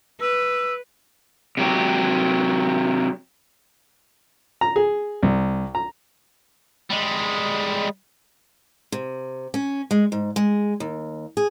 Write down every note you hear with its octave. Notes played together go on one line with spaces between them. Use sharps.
B4 E6
C3 F#3 G4
A#5
G#4
C2
A#5
G3 G#3
C3
C#4
G#3
G#2
G#3
D#2
G#4